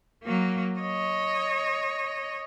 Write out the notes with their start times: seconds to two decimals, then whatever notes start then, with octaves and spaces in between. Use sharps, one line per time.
0.23 F#3 A#3
0.79 C#5 D#5